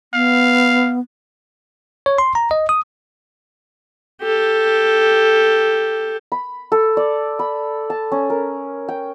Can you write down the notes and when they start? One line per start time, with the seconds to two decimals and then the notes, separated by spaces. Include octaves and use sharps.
0.13 B3 F5
2.06 C#5
2.18 C6
2.35 A#5
2.51 D#5
2.69 D#6
4.22 G4 A4
6.32 B5
6.72 A4
6.97 D5
7.39 B5
7.90 A5
8.12 C#4
8.30 A#4
8.89 G5